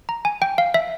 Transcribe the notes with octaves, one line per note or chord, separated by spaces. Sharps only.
A#5
G#5
G5
F5
E5